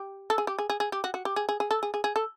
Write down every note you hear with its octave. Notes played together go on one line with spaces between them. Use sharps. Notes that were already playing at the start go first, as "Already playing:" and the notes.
Already playing: G4
A4
G#4
G4
G#4
G#4
G#4
G4
F#4
F#4
G4
G#4
G#4
G#4
A4
G#4
G#4
G#4
A4